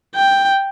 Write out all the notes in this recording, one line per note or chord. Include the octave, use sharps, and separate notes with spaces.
G5